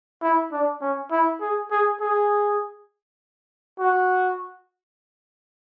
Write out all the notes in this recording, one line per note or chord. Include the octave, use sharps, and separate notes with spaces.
E4
D4
C#4
E4
G#4
G#4
G#4
F#4